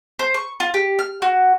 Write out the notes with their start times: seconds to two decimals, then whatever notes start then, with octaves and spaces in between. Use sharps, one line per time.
0.19 C5
0.34 C#6
0.60 F4
0.74 G4
0.99 F6
1.22 F#4